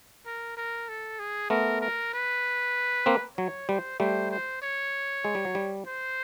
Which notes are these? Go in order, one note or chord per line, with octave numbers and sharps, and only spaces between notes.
A#4
A#4
A4
G#4
A3 B3 A#4
A#4
B4
A#3 C4
F#3 C#5
G3 C5
G3 A3 C5
C5
C#5
G#3
G3
F#3
G3
C5